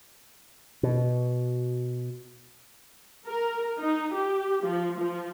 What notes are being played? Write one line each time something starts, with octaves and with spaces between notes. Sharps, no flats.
B2
A#4
D#4
G4
F3
F3